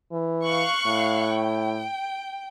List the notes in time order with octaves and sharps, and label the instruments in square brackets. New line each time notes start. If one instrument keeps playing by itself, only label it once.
[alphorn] E3
[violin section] F5 C#6 F#6
[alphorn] A2
[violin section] G5